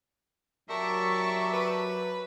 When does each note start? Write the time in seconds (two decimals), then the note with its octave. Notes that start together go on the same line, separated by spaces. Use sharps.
0.69 F#3 G4 A#4 D5 E5 A5 C#6
1.53 B4